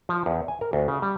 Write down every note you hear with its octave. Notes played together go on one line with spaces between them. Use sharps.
F3
E2
G#5
A#4
D2
C#3
G3